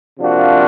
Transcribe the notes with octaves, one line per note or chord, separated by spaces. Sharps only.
C3 F3 A#3 D4 F#4